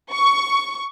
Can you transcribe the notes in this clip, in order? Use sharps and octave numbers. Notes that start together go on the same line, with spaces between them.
C#6